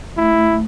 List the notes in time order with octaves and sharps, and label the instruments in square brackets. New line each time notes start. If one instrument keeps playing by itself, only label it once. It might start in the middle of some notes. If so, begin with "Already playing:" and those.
[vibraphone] A3 [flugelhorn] E4